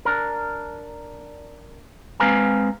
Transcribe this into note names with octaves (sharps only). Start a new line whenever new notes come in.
D4 A#4
G#3 C4 B4 F5 G#5 A#5